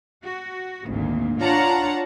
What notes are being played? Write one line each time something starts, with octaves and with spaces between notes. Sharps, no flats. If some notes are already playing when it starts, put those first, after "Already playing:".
F#4
G#1 D2 A#2
D4 F4 C#5 F#5 A5 A#5